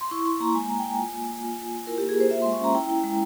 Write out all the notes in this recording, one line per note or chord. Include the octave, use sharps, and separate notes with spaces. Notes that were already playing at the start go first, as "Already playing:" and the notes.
C6
E4 C#6
E4 C6
A#3 A#5
G#3 G#5
G#3 A#5
G5
G#3 G#5
F4
A#3
A#3
F4
F4
F4
E4 A#4
A#3 G4
G#4
A#3 C5
F4 E5
G#3 C6
C#6
C#4 A#5
E4 G5
E4
G#3